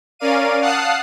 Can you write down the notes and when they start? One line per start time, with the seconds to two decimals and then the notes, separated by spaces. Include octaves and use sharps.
0.19 C#4 A#4 D5 F5 D#7
0.61 F5 F#5 A5 D#6 F#6 C7